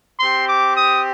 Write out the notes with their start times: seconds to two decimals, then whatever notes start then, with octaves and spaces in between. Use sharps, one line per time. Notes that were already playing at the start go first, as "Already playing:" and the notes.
0.20 C4 G4 C6
0.48 D6
0.76 D#6